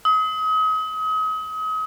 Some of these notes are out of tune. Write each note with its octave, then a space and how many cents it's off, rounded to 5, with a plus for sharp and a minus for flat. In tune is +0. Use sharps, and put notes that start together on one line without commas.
D#6 +35